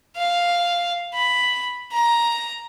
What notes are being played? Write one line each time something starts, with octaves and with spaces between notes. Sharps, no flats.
F5
B5
A#5